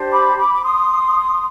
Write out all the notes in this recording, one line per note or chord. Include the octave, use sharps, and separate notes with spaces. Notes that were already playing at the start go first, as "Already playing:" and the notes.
Already playing: D4 G4 C5
B5 D6
B5 D6
D6
C6 D#6